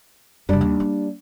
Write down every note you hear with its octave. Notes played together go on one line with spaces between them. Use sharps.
F#2 C#3 G3 D4
D#2
A#3